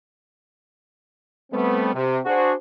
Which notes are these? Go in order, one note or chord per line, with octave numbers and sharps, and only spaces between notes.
G3 A3 B3 C4
C3
D4 F#4 G#4 C5